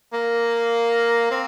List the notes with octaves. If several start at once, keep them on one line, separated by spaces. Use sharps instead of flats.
A#3
C4